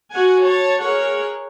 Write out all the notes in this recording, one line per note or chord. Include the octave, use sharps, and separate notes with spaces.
F#4 F#5 G#5
C#5 A5
G#4 A#4 C#5 F#5